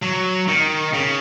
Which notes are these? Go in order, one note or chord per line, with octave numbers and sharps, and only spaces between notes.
F#3
D#3
C#3